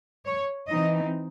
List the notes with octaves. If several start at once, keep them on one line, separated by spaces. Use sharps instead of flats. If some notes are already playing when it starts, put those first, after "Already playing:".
C#5
E3 C4 D#4 D#5